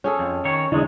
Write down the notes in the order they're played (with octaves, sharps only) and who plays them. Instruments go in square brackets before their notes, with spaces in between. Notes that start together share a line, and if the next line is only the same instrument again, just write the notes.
[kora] C#4 G#4 A4
[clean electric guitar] F2
D#3 C#5
[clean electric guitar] E2 G#3 [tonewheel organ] D3 E4 D#5